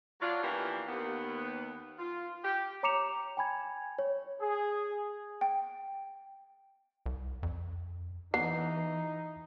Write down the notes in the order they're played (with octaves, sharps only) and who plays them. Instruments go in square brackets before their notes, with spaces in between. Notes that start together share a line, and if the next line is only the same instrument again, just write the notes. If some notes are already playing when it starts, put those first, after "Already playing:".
[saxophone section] F#3 D4 F4
B2 E3 F3 A#3 D4 G4
D#2 B3
F4
G4
[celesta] C#5 A#5 D6 C#7 E7 F7
G5 G#5 B5 G#6
C#5
[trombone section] G#4
[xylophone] G5
[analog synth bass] C2
F2
[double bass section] E3 [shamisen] B3 [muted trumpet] D#4 [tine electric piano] C7